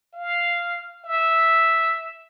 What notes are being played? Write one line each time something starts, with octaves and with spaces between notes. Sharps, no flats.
F5
E5